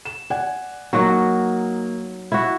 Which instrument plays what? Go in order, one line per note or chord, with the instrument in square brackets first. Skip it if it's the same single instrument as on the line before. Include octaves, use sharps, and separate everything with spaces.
[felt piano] E7
D5 F#5 G#5
[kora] F#3 F#4 [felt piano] A#3 D#4
[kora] E4 F#4